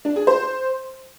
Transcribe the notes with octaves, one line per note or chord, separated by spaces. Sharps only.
D4
G#4
C5